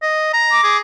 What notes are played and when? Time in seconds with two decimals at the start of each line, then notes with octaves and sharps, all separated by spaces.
0.02 D#5
0.33 A#5
0.52 D6
0.63 G#4